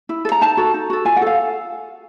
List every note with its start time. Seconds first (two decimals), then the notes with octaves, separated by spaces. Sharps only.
0.09 E4
0.25 A4
0.32 A#5
0.41 D#4 A5
0.57 F#4 A4
0.74 D#4
0.90 F#4 A4
1.05 F4 G#5
1.17 F#5
1.22 A4 F5